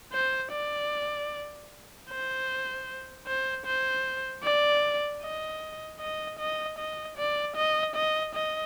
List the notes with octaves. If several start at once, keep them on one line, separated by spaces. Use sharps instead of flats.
C5
D5
C5
C5
C5
D5
D#5
D#5
D#5
D#5
D5
D#5
D#5
D#5